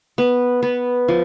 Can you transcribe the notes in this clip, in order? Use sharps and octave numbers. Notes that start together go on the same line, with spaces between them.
B3
B3
F3